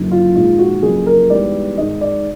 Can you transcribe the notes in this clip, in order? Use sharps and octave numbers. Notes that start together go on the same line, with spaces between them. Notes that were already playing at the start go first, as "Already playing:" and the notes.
Already playing: F#1 F#2 D3 F#3
F4
A#1 G#2 D#3 F4
F#4
F2 C#3 F#3 A#3 G#4
A#4
G#2 E3 G3 B3 D5
G#1 G#2 D#3 D#5
D5